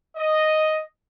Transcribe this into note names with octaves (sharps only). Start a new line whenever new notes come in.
D#5